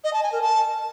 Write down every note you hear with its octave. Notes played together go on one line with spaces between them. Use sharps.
D#5
A5
G#5
A#4
A5